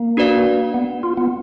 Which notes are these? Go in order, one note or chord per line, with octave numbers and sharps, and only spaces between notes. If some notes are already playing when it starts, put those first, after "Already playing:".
Already playing: A#3
D4 F#4 B4 D5 F5
B3
F4
B3